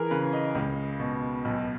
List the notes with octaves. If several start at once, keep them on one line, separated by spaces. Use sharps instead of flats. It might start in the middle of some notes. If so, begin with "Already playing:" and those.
Already playing: E3 G#4 A#4
C#3 B4
D#5
C#2
B2
B1